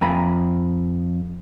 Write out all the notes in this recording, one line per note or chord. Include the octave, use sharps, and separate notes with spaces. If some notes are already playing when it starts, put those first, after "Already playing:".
F2 G#5 A#5 B5